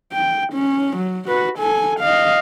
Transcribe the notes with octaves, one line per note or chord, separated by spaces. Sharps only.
G5
C#4
F#3
F#4 B4
A4 G#5
D#5 F5